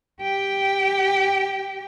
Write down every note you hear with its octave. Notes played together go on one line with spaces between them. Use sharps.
G4 G5